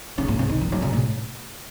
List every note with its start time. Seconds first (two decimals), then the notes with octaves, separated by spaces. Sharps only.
0.18 C#3
0.28 A2
0.39 C3
0.49 D#3
0.61 E3
0.72 F#3
0.82 C3
0.93 A2